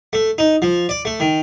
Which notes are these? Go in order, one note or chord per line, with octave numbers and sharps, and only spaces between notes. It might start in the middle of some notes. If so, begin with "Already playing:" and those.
A3
D#4
F3
D5
A3
D#3